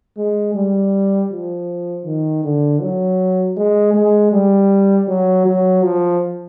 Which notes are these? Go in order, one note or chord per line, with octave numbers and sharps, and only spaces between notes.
G#3
G3
F3
D#3
D3
F#3
G#3
G#3
G3
F#3
F#3
F3